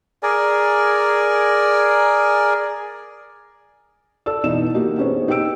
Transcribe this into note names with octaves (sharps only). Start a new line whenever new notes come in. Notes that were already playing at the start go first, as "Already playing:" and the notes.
G#4 A#4 D5 G#5
A4 D5 A5 E6
B2 E3 D#4 E7
A#3 D#4 F#4 G4
B3 C#4 G#4 C5 C#5
D#4 G4 G5 E6 D7